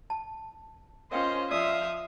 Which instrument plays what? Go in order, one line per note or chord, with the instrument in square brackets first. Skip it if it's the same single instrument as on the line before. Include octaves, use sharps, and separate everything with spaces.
[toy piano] A5
[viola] C#4 F4 [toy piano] A#4 F5 G5 [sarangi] C5 [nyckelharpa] D#5
[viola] F3 [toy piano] D5 [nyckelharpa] E5 D#6 [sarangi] F5